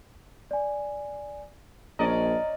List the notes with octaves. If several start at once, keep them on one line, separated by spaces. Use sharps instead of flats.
D5 G#5
A#1 C#4 D5 D#5 A#5